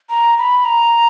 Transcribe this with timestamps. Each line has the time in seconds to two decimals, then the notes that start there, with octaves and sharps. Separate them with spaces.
0.10 A#5
0.38 B5
0.65 A#5